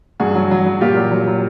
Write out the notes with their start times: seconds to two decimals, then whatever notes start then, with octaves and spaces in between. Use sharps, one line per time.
0.20 G2 F#4 G#4
0.35 F#3
0.51 F#3
0.66 F#3
0.81 A#2 F4 G4
0.97 F#3
1.11 F#3
1.27 F#3